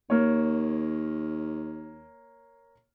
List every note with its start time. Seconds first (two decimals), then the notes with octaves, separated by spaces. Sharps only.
0.10 D#2 A#3 C#5